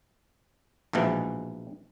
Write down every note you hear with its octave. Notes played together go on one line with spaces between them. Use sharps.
A#1 G#2 B2 E3